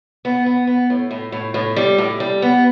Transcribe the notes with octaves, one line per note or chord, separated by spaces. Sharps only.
B3
B3
B3
A2
A2
A2
A2
G3
A2
G3
B3